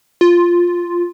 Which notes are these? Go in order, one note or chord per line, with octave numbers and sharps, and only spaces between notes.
F4